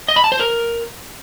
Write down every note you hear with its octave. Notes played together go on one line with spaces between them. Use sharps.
D#5
B5
A5
C5
A#4